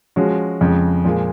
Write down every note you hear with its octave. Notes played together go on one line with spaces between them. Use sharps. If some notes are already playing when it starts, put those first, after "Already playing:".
F3 G#3 C#4 F#4
F2 C#3 G#3
A#2 F3 G#3